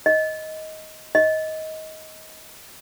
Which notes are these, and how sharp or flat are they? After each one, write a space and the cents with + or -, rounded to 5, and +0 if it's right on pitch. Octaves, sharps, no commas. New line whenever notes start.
D#5 +15
D#5 +20